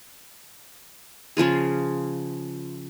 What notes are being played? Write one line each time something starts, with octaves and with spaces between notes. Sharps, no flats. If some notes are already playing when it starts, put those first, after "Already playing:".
C#3 F3 F4 G#4